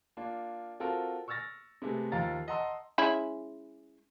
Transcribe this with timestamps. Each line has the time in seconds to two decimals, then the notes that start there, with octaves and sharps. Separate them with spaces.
0.17 A#3 D4 F4
0.80 C4 F4 F#4 A4 A#4
1.28 C#6 E6 F6 A6 A#6
1.82 C3 G#3 A3 B3
2.12 D#2 F3 F5 A#5 A6
2.48 D#5 F#5 A5 A#5 C6 E6
2.98 G#3 C#4 E4